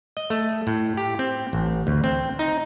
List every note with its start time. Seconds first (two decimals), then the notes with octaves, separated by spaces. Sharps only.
0.17 D#5
0.30 A3
0.67 A2
0.97 G4
1.19 C4
1.53 A1
1.87 D2
2.04 C4
2.39 D#4